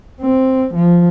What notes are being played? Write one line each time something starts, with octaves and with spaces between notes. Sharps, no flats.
C4
F3